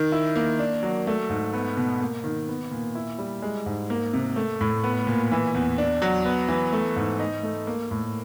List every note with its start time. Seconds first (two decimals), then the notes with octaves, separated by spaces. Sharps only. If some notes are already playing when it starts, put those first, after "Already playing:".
Already playing: D#3
0.12 E4
0.36 A#3
0.59 D4
0.83 F#3
1.07 A3
1.29 G#2
1.53 B3
1.77 B2
2.01 A#3
2.24 D#3
2.48 B3
2.71 A#2
2.95 E4
3.19 G3
3.42 G#3
3.66 G#2
3.90 A#3
4.13 C3
4.36 A3
4.61 A2
4.84 B3
5.07 A#2
5.32 E3
5.55 E2
5.78 D4
6.02 F#3
6.25 B3
6.49 E3
6.73 A3
6.96 G#2
7.20 D#4
7.43 A3
7.67 A#3
7.91 A2